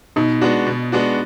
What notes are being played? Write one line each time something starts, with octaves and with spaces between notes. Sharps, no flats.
B2 D#4
G#3 B3 D4 F#4
B2
G#3 B3 D4 F#4